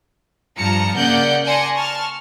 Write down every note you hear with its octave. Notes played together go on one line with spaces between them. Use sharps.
G2 F3 A5 A#5 C#7
C#3 A#3 D5 F#5 G6
D5 G#5 A5 C6 A#6 C#7
A5 C#6 F6